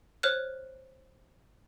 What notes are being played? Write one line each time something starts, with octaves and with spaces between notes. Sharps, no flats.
C5 C#5 F6 F#6